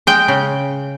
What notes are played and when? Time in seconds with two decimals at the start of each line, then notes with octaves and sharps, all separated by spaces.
0.07 G#3 G5
0.28 C#3